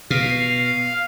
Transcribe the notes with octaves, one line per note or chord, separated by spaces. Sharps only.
B2 F5